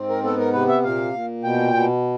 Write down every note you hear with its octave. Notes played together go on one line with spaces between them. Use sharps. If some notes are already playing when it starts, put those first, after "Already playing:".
Already playing: G#2 C4
A#4
B3 A4
A#4
C3 B4
E5
A#2 F5
A#2
B2 G5
B2